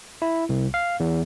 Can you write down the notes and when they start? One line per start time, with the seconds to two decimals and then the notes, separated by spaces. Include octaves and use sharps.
0.22 E4
0.49 C2
0.74 F5
1.00 E2